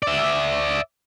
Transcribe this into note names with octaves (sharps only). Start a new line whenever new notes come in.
D5 E5